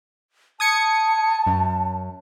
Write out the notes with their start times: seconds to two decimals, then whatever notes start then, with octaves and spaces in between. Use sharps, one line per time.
0.60 A5 D#6 G#6 C#7
1.47 F#2